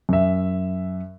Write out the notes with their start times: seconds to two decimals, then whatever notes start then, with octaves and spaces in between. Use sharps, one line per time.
0.09 F#2 E5